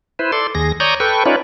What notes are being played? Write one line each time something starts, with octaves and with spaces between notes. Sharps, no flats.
E4 B4 C5
A4 D5 C6
D#2 G#4 A#6
C#5 D5 A#5 C#6 D#6 G6
A4 B4 G5 C#6
C#4 D#4 F4 B4 C#5 D5